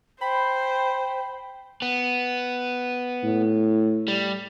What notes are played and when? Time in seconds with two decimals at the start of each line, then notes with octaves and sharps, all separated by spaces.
0.21 C5 G5 B5
1.82 B3
3.24 A2
4.08 G3